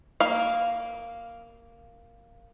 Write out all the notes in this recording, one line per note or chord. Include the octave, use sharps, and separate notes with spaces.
A#3 F5